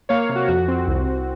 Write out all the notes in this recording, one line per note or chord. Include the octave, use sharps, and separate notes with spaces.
A#3 C#5 F5
C3
F#4
F2 F#4
C4
C2
C2